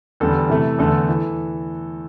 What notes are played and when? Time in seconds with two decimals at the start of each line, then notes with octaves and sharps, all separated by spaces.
0.20 E2 D3 G3 A4
0.50 C3 E3 A3
0.78 E2 D3 A3 A4
1.09 E3